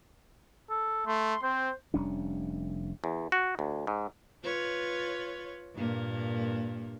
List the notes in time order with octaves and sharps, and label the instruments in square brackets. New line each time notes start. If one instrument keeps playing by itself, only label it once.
[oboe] A4
[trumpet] A3 [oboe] C6
[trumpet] C4 [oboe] C5
[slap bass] F1 G3 C#4 D4
[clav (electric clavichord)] E2
F#4
D2
G#2
[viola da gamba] F4 B4 C#5
G2 A#2 A#3